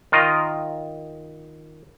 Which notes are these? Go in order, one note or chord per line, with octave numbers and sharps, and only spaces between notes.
D#3 F4 A#4 D#5